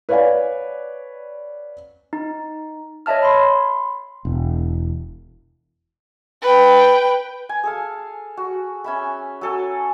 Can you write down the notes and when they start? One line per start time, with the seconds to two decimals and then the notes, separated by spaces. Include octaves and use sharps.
0.09 B4 C#5 D5 F5 F#5 G#5
2.13 D#4
3.06 C#5 D#5 E5 A5 F6
3.23 B5 C6
4.25 E1
6.42 B4 G5
7.49 G#5
7.63 G#4 A4 F5
8.37 F#4
8.84 C#4 E5 B5
9.41 F#3 A4 G#5